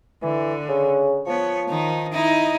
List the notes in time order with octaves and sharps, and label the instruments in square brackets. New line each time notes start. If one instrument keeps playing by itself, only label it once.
[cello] D3 [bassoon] E3
[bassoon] C#3
[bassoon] F3 [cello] B3 C#5
[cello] D#3 [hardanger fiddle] D#4
[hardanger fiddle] D#4 E4 [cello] D#5